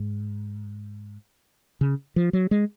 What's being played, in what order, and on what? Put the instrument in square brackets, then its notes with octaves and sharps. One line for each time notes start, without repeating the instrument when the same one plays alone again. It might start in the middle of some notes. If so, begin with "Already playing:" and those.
Already playing: [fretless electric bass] G#2
C#3
F3
F#3
G#3